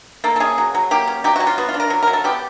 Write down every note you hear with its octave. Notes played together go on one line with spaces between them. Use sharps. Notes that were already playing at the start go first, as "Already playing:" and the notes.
A#3 A4
A4
C#4 G#4
F#3
F#3
A#3 G4
C#4
F#3 G4
F#3 F#4
F4
B3 F#4
F4
D4
A#4
F#3
F#3 A#4
A4
B3 G4